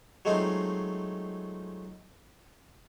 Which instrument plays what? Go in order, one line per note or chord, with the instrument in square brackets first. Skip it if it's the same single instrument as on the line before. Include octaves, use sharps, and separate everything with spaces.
[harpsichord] F#3 G#3 A3 C4 D#4 F4